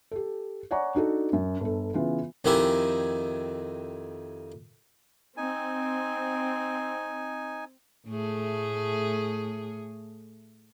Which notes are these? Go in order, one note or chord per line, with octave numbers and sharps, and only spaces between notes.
G4 A4
C#5 D5 F#5 G#5 A#5 C#6
D4 D#4 F#4 A4
F#2
G1 A4
C#3 E3 B3 F4
F2 D#3 E4 G4 G#5
C4 D#4 G#5
A2 A3 G#4